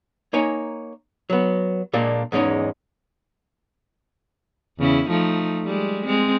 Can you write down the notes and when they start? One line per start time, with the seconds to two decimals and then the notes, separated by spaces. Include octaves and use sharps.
0.33 A#3 D#4 C#5 G#5
1.30 F#3 B3
1.93 A#2 G#3 A#3 D4
2.32 E2 G#2 G#3 C#4 D#4
4.78 E2 C#3 E4
5.10 F3 A3 D#4
5.65 G3 G#3
6.06 G#3 C4